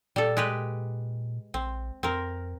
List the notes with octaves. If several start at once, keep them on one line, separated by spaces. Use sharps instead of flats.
A#2 G3 A4
G#3 G4 B4
A#1 C4
F2 C4 A#4